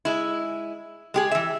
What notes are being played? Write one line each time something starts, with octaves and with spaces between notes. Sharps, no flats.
G#3 E4
G#3 G4 G#4
E3 E5